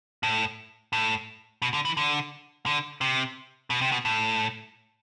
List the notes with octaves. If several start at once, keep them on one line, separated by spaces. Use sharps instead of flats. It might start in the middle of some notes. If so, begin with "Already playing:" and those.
A2
A2
B2
D3
E3
D3
D3
C3
B2
C3
B2
A2